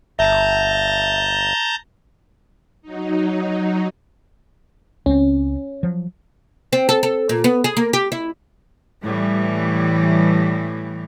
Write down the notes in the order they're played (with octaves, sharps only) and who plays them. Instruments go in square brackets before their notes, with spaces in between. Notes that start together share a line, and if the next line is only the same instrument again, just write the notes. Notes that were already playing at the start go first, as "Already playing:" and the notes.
[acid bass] G1 [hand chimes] E5 [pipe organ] A5 A#5 G6
[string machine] F#3 D#4
[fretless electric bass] C#2 C4 [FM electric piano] C#4
[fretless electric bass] F3 F#3
[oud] C4
A4
A4
A#2
B3
G#4
A#3
G4
E4
[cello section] A2 E3 G3